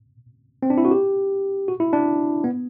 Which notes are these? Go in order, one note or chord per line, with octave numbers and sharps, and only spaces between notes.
C4
D4
E4
F#4
G4
F#4
E4
D4
B3